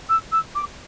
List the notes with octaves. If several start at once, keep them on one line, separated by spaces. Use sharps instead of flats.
E6
E6
D6